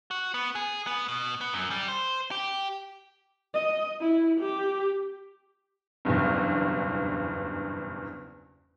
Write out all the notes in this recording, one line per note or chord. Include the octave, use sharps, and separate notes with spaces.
F#4
B3
G#4
B3
B2
B3
F#2
G3
C5
G4
D#5
E4
G4
F#1 B1 E2 G2